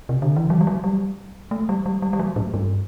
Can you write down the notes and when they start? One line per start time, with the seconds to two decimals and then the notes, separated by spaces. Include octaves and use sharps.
0.09 C3
0.22 D3
0.36 E3
0.50 F#3
0.61 G3
0.67 F#3
0.84 G3
1.51 A3
1.69 G3
1.86 G3
2.02 G3
2.13 G3
2.19 F#3
2.36 A2
2.54 G2